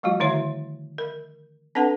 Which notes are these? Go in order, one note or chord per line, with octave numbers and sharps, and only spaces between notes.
F3 G3 A3 F4 F#4
D3 D#3 E4 F#4 C#5 E5
A#4
C4 D4 A4 B4 F#5 A5